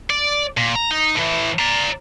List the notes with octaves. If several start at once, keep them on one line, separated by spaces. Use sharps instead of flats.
D5
A#2
A#5
D#4
A2 E3
D5 A#5